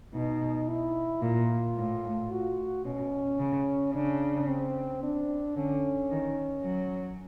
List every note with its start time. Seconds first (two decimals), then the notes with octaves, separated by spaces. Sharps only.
0.14 B2 D#4
0.68 E4
1.22 A#2 F4
1.76 A2
2.31 F#4
2.85 B2 C#4
3.39 C#3
3.93 C#3 D4
4.48 C4
5.03 D4
5.56 D3 C#4
6.11 D#3
6.64 F#3